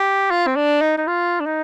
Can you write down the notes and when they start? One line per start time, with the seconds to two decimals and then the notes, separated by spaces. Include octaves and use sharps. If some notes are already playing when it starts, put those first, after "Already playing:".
Already playing: G4
0.31 F4
0.47 C4
0.56 D4
0.81 D#4
0.98 D#4
1.07 F4
1.40 D4
1.46 D#4